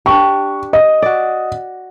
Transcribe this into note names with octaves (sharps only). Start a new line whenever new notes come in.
D4 G4 C#6
D#5
F#4 D5